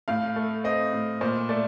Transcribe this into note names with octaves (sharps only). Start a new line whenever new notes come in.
A2 F5
A3
C4 D#5
A2
A#2 C5
A3 D5